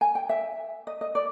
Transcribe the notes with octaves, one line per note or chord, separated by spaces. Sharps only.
G#5
G5
E5
D#5
D#5
D5